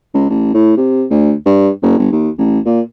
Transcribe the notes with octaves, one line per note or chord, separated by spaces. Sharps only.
C#2
A1
A2
C3
D2
G2
F#1
G1
D#2
A1
A#2